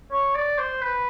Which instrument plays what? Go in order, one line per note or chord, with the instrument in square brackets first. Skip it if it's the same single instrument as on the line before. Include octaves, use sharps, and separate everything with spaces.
[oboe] C#5
D5
C5
B4